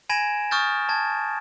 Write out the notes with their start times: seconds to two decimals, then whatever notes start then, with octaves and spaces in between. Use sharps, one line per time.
0.09 G#5 B5 G#6 A#6 D7 E7
0.51 C#6 D#6 F6 G6 A6
0.89 A5 G#6